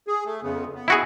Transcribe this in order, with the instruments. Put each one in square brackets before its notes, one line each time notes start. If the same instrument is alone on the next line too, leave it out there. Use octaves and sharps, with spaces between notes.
[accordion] G#4
A3
F2 C#3 B3
B3
[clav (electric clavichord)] E4 F#4 G#4